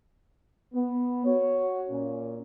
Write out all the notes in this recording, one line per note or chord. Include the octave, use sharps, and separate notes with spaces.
B3
F#4 C#5
A#2 C#4